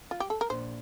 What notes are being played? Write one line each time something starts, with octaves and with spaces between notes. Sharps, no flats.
F4
G4
A4
A#4
A#1 C5